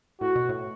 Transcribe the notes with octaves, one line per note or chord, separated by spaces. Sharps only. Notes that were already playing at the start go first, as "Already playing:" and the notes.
A2 F#4
B2
A2